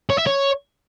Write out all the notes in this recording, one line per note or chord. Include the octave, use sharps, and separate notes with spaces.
C#5
E5
C#5